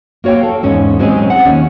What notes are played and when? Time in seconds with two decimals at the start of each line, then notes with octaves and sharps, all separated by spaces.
0.24 A#3 F#4 C#5 F5 G5
0.43 A4
0.63 E2 G#2 C#4
0.99 F#3 G#3 C4 C#4 G#4
1.30 F#5
1.45 D#2 C#4